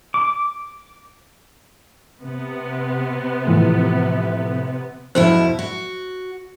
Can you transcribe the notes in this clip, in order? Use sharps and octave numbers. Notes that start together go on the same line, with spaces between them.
D6
C3 B3
A2 E3 F3
F2 B2 E4 C5
F#4